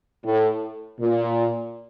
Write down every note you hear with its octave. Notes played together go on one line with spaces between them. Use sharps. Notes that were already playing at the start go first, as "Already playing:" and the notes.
A2
A#2